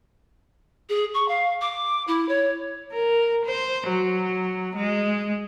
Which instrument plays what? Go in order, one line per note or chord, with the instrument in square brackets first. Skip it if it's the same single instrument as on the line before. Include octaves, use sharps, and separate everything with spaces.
[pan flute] G#4
C#6
F5
D6
E4
C#5
[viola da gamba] A#4
C5
F#3
G#3